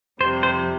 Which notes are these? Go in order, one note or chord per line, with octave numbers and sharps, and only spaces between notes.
F2 C3 G3 C5
C5